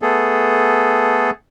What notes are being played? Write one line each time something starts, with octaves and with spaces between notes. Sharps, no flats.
A3 B3 G#4 A4